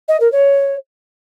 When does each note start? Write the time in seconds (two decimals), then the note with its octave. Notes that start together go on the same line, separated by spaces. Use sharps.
0.08 D#5
0.20 A#4
0.32 C#5